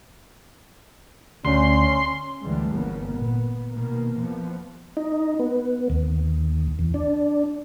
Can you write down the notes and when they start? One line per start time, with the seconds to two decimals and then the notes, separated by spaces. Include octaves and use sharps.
1.45 D2 C#4 C6
2.43 D2 G2 D3 E3 G3 G#3
2.72 G1 F2 C#3 A#3 B3
3.10 A#2 B3
3.71 B2 D#3 A#3 B3
4.18 F2 F3 B3
4.97 D#4
5.39 B3
5.90 D#2
6.79 E2
6.94 D4